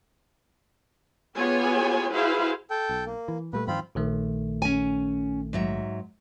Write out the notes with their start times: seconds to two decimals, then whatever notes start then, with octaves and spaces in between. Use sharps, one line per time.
1.35 B3 F4 G4 G#4 C#5 G#5
2.12 E4 F#4 G#4 B4 C5 F5
2.70 A4 G5
2.89 B1
3.06 A#3
3.28 E3
3.53 A#2 G3 A3 B4
3.68 G2 D#3 F3 C4 F4 B5
3.95 A#1 D#3 A3
4.62 C#4 G#5
5.53 G#2 F#3 E5